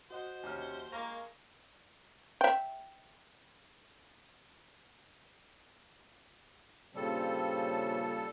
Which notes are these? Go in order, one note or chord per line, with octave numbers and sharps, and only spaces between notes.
F#4 C5 D#5 F#5
D#2 C3 C#4 F6
G#3 A#3 A#5 C#6
E5 G5
G2 A#2 C#3 G3 C4 A4